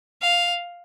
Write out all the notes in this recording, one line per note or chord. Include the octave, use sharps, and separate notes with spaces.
F5